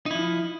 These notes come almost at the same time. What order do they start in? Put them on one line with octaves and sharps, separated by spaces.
D#4 E4 F3